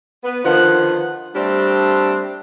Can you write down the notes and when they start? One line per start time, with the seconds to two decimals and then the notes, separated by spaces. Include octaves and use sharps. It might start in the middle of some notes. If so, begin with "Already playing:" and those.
0.24 B3
0.45 D3 D#3 F3 B4 F#5
1.36 G3 A3 C4 D4